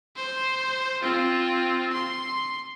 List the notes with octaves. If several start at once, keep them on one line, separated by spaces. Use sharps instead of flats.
C5
C4 F4
C6